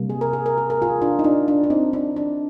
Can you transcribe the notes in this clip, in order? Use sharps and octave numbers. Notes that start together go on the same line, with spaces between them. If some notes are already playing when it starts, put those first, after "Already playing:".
Already playing: C3 G3 A#3
G#4
A#4
G#4
A#4
G#4
A#4
F4 G#4
D4 F4
D#4
D4
D4
D4
C4 D#4
D4
D4